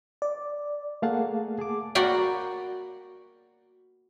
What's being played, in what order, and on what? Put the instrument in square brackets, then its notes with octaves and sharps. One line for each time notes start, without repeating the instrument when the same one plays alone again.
[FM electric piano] D5
[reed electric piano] A3 A#3 G#4 F5 F#5 A5
G#4 A5 D6
[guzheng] A#3 F#4 D5 G5 B5